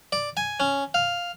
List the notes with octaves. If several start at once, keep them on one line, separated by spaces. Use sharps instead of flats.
D5
G#5
C#4
F5